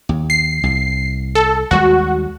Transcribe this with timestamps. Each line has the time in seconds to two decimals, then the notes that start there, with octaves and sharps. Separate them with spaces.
0.09 D#2
0.30 C7
0.63 C2
1.35 A4
1.71 D#2 G3 G#3 F#4